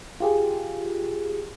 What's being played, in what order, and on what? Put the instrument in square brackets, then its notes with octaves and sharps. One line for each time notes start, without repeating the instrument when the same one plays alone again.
[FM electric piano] F4 G4 G#4